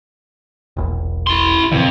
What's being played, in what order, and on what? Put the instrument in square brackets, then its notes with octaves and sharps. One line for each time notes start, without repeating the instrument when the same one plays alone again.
[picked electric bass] E1 A#1
[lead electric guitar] E4 C6
[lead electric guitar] F2 [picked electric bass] A#2 C#3 E3